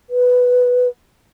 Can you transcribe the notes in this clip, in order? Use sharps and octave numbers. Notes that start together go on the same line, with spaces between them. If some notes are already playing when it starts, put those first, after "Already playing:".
B4